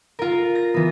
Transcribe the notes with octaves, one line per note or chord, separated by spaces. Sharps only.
F4 A#4
A#6
E3 B3